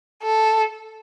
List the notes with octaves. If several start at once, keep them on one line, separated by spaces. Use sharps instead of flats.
A4